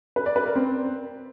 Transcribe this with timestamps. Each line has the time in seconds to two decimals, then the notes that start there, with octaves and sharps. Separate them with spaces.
0.16 B4
0.26 D5
0.36 B4
0.46 A#4
0.55 C4